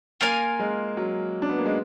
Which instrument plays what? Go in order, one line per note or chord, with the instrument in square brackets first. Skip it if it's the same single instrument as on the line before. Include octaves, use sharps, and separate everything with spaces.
[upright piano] A#3 [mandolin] F4 A#4 F5 G#5
[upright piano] G#3
F#3
D4
B3
A#3
G#3